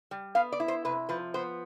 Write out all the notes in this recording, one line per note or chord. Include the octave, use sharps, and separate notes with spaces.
G3
B3 F5
D5
E4
C5
C3 B4
F3 B4
B3 C5